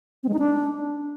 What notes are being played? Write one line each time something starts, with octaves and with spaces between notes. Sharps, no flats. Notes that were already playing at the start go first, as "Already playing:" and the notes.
C4
G#3
D#4
D4